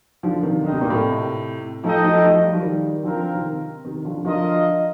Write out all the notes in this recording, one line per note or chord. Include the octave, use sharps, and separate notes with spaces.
D3 F3
C3 D#3
D3 D#4 A#4 D#5 G5
C3
A#2
A2 C3
F3 A3 D#4 A4 D#5 G5
F3 A3
F3 A3
G3
F3
D#3 G3
D3 F3 C4 F4 A#4
C3 D#3
C3 D#3
D3 F3
D3 F3 F4 A#4 D#5